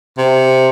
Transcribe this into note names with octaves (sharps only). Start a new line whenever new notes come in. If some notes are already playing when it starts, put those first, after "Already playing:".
C3